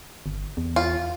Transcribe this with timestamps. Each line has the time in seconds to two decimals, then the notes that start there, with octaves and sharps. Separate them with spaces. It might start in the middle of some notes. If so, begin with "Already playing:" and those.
0.26 G1
0.57 E2
0.76 F4